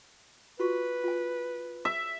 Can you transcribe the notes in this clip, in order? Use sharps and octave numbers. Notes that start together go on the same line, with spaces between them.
F4 F#4 B4 C#6
F4 G#5
E5